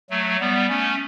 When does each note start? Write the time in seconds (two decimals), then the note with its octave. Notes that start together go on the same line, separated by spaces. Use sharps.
0.10 F#3 A3
0.40 G3 B3
0.69 A3 C#4